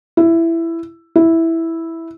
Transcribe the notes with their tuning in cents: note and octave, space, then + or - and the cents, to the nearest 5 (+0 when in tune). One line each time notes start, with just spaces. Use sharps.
E4 +10
E4 -5